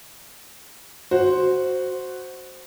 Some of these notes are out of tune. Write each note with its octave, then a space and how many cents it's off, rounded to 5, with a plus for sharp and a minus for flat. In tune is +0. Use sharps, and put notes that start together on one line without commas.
F#4 +0 C5 +0